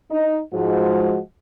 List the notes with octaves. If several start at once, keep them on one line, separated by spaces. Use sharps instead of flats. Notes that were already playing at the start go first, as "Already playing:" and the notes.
D#4
G#2 F3 G#3 F#4